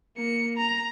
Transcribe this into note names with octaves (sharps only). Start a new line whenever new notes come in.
A#3 C#7
A#5